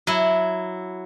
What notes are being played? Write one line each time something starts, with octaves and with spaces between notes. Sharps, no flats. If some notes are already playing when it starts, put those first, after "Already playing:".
F#3 E4